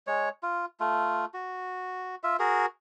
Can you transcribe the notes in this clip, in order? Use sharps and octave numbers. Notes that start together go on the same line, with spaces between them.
G#3 C#5
F4
A3 F4
F#4
F4 E5
F#4 G#4 A#4